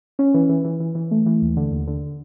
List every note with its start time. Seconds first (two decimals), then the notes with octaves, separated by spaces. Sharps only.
0.19 C#4
0.34 E3
0.49 E3
0.65 E3
0.80 E3
0.95 E3
1.11 A3
1.26 E3
1.42 D#2
1.57 D3
1.72 D#2
1.88 D3